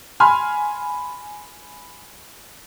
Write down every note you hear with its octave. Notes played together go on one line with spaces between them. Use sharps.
G#5 B5 C6 F6